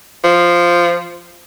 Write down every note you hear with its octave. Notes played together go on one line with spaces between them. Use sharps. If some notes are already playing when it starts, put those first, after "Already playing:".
F3